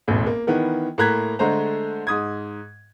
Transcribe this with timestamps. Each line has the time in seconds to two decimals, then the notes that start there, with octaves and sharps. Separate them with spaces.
0.08 E1 A1 A2
0.27 A#3
0.47 D#3 E3 B3 A#4
0.98 A2 A#3 A#5 F#6 G#6 B6
1.39 D3 G#3 A3 C5 A#5
2.07 G#2 D#6 G#6